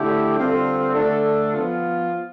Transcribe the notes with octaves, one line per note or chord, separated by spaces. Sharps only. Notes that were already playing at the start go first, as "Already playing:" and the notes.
Already playing: D3 A3 E4 G4
D3 G3 C4 F4 A4
D3 A3 D4 A4
F3 B3 F4